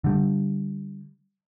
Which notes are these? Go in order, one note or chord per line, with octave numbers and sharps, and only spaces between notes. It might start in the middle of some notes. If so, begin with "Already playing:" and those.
D3 G3